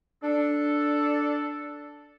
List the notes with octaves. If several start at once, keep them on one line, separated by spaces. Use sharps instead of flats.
D4 A4